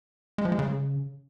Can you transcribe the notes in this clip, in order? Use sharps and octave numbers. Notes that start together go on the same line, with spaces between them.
G#3
F3
G#3
C#3